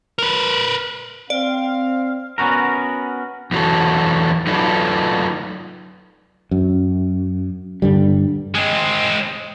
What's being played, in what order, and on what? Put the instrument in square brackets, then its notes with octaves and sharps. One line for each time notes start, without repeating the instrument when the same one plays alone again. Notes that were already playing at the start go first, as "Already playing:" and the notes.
[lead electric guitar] A#4 B4
[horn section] C4 F5 [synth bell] D5
[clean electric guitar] B3 C#4 F#4 A#4
[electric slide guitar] E2 E3 F#3 F#4 A4
F#3 D#4 F4 A4 B4 D5
[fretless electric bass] F#2
G2 D3 G3
[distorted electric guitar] G#3 C4